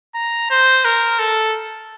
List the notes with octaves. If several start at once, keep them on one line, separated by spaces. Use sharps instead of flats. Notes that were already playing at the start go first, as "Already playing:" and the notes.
A#5
C5
A#4
A4